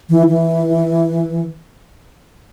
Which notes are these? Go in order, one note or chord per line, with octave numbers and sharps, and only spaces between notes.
E3
E3